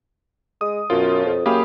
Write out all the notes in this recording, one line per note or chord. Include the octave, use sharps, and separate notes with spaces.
G#3 D#6
F#2 B2 F4 C#5
F2
F#2 A#3 G4 G#4 F5 B5 D#6